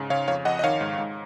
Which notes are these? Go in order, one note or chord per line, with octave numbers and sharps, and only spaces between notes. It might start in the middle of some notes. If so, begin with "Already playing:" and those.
Already playing: G#2 C#3
C#3 C#5 F5
F2 C#5 F5
F2 D#5 F#5
D#5
D#3 C#5 F5
G#2
G#2